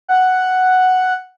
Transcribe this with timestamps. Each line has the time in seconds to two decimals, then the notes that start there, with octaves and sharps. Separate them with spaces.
0.08 F#5